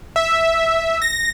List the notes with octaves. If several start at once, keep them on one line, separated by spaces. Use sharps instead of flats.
E5
A#6